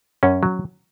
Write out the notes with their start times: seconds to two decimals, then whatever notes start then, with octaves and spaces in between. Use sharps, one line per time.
0.23 F#2 C#4
0.43 F#3